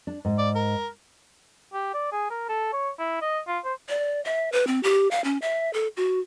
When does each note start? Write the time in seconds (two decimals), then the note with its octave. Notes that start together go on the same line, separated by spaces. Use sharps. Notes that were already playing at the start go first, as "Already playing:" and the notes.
0.07 D4
0.25 G#2
0.38 D5
0.55 A#4
1.74 G4
1.94 D5
2.12 G#4
2.30 A#4
2.49 A4
2.73 C#5
2.99 E4
3.22 D#5
3.47 F4
3.65 C5
3.89 D5
4.25 E5
4.52 B4
4.67 C4
4.83 G4
5.11 F5
5.24 C#4
5.42 E5
5.73 A4
5.97 F#4